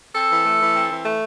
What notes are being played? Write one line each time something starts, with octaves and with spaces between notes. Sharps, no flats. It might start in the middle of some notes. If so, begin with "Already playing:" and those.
C4 A4
E3
A3
E3
C4
E3
A3